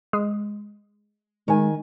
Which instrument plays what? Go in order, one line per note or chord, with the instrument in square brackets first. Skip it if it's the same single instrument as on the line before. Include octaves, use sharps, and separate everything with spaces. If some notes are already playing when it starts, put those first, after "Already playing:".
[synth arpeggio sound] G#3
[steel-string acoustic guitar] D#3 G#5 [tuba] G#3